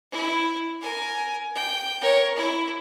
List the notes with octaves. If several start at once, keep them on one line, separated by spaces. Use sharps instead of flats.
E4
A#4 G#5
G5
A#4 C#5
E4